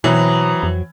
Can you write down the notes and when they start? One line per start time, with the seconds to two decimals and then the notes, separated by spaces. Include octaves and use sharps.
0.04 B2 E3 F#3 C4 A#5 B5 D#6
0.63 F2